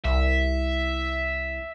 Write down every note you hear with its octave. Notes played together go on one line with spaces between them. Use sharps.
C2 E5